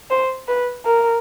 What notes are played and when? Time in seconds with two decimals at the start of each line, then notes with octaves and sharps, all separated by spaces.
0.10 C5
0.48 B4
0.85 A#4